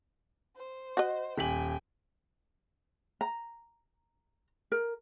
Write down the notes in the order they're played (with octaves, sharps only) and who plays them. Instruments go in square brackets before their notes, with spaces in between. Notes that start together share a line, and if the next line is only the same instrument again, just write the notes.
[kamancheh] C5
[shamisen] F#4 D#5
[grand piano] D#1 B6 F#7 [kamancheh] G5 G#5
[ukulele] A#5
A#4